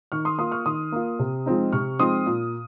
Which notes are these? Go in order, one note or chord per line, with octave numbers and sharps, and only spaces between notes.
D#3 C#6 F6
C6 D#6
A#3 F4 C6 D#6
C#6 F6
D#3 C6 D#6
A#3 F4
C3
F3 G#3 C4 D#4
C3 C#6 F6
F3 G#3 C4 D#4 C6 D#6
A#2